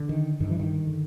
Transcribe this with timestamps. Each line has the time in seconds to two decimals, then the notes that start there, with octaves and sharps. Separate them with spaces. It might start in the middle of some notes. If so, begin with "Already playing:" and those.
Already playing: D3
0.09 D#3
0.40 G2 D#3
0.50 E3
0.59 D#3
0.87 D3